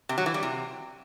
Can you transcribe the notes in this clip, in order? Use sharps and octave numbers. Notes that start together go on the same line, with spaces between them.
C3
F#3
E3
G3
C3